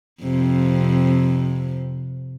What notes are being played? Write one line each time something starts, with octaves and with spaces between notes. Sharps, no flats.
F2 C3